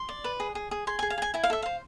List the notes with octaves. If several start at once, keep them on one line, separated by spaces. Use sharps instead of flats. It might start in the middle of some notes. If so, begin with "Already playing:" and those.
Already playing: C6
D5
B4
G#4
G#4
G#4
G#4 C6
G#5
G#4
F5
G#4 G#5
E4 G#5
F5
A4 E5
C5 F5